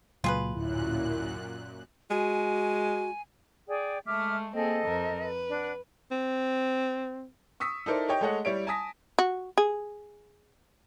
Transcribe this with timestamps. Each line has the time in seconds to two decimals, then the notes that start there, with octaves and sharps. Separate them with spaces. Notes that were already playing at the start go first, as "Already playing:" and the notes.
0.24 C#2 A#2 F#3 F4 G#4 B4
0.55 D1 F#2 A#2 E4 F#6
2.10 G#3 F#4 G#5
3.69 G#4 D5 G5
4.06 G#3 A3 E5 D6 F6
4.54 A#3 C4 G#4 A4 D#5
4.84 F2 A#4 C5
5.21 B4
5.51 D4 F#5
6.11 C4
7.60 C#6 D#6 E6 B6
7.86 D#4 E4 A4 A#4 C5 D5
8.09 G4 C#5 D#5 G5
8.21 G#3 A3 A4 C#5 D#5 F#5
8.45 G3 E4 C#5 E5 D7
8.67 G#5 A5 D#6 A#6 B6
9.19 F#4
9.58 G#4